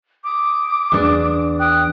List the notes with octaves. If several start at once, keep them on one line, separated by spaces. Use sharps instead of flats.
D6 D#6
E2 D4
G5 D#6 F#6